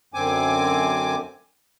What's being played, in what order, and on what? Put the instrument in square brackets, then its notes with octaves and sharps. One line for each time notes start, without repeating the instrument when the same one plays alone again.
[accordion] F#2 D3 C4 G#5 D6